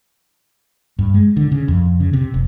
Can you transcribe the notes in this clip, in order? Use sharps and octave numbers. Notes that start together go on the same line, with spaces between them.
G2
G#3
D3
C#3
F2
C#3
C3
F1